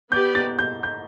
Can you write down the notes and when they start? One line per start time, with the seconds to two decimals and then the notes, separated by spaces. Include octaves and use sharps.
0.12 B3 G4 B4 D5 G6
0.35 A6
0.59 G6
0.83 G6